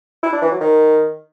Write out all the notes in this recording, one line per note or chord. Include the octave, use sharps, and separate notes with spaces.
E4
D4
E3
F#3
D#3